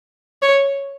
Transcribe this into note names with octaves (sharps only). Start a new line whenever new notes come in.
C#5